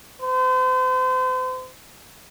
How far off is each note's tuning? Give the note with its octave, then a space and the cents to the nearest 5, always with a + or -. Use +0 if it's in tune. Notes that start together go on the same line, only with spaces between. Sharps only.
C5 -40